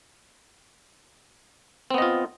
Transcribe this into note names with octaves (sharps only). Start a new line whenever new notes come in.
B3 C4 F4 D#5